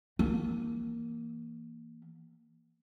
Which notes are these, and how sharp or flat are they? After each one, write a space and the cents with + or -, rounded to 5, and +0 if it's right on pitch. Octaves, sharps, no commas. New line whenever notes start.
E3 +0 A#3 +0